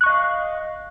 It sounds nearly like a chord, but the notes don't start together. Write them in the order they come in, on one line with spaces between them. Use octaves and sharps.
F#6 C#6 D#5 F5